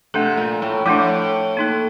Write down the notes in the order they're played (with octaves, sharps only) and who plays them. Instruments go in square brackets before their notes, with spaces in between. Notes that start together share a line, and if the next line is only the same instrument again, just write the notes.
[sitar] C3 [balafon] A3 D4 A4
[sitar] A#2
A2
[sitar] A2 [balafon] F3 A3 D4
[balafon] A#3 D#4 A4